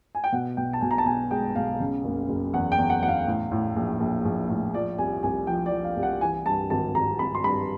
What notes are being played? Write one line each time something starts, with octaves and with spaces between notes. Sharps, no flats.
G#5
G5
B2 F#5
B1 G5
A5
B1 G#5
A#5
A5
B2 G#5
G#3 G5
B1 F5
C#3
F#1
F#1
E2 F#5
G5
E2
F#5
E2 F#5
F5
A2
A2
A#1
A#1
A#1
A2
F3 D5
C2 G#5
C2 G#5
F3 G5
D5
F3
F5
C2
F#5
E3 G#5
G2 A5
G#1 A5
G#1 A#5
G#1 B5
C6
G2 B5